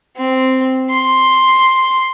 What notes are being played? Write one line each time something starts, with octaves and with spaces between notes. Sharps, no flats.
C4
C6